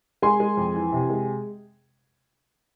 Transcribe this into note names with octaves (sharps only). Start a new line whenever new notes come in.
G#3 G#5 C6
G#3
F2
E3
C3
G#3